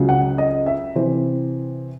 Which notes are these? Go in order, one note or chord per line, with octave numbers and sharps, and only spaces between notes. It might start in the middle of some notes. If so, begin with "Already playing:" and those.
Already playing: C#2 C#3 F#3
F#5
D#5
E5
C3 E3 C4